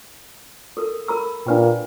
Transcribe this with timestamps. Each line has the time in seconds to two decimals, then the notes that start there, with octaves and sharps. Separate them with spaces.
0.77 A4 A#4
1.08 A#4 B5 E6
1.47 A#2 D4 B4 G5